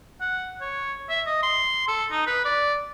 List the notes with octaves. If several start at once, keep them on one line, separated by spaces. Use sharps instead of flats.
F#5
C#5
E5
D#5
C6
A4
D#4
B4
D5